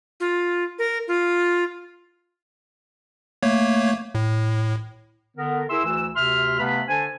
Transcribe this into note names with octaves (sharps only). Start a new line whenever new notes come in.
F4
A#4
F4
A3 A#3 C#5
A2
D3 B3 A#4
E4 G#4 A#4 E5 C6 E6
D2 E3 E6
D2 C3 E5 C6 F6
C3 A3 B3 B4 F5 B5
D3 D4 A4 C5 G#5